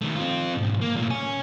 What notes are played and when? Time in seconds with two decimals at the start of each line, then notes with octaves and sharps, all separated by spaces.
0.01 D#3 A3
0.16 C4 F4
0.57 B1 G#2
0.81 A#3
0.96 A#2 A3
1.10 C#5 G#5